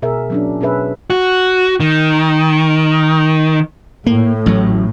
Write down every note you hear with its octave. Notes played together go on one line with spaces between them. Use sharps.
B2 G#4 A#4 E5
F#3 C#4 D4
B2 C#4 G#4 B4 E5
F#4
D#3
A2 A#3
A1 F#3